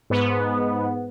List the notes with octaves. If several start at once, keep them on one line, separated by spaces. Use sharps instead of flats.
G#2 B3